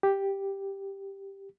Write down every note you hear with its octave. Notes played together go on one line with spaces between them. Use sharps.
G4